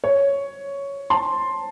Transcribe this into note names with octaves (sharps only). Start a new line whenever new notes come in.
C#5
A5 C6